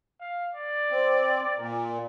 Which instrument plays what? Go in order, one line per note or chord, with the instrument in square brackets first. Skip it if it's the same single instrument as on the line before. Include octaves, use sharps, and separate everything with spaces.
[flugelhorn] F5
D5
[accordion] C4
[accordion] A#2 [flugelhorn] A#4